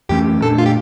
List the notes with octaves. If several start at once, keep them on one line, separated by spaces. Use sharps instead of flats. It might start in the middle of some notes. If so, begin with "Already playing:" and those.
F2 E3 A3 C#4 G4
A#2 A3 D4 A4
F4
G4